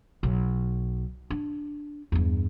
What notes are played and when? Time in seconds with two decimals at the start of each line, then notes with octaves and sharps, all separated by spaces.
0.23 B1
1.30 D4
2.12 E2 G2